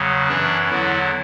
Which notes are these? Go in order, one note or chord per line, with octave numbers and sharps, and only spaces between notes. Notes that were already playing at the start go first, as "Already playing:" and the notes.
Already playing: E2 C#3 F#3
F#2 E3 D4
E2 D3 F#3 E4